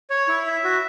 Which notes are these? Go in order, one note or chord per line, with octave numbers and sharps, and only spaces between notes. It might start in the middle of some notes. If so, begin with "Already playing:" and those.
C#5
E4
E5
F#4